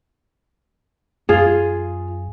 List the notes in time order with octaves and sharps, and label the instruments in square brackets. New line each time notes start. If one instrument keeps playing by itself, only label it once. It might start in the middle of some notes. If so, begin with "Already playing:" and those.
[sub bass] F#2 [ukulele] F4 [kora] G#4